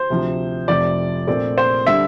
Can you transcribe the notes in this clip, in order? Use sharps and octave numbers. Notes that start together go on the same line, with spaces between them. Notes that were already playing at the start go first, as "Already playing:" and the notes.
Already playing: C5
D2 C3 F3
F1 F2 C3 F3 D5
A#1 A#2 A3 C4 D5
C5
D3 G3 E5